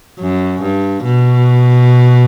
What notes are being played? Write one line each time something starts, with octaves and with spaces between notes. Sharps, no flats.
F#2
G2
B2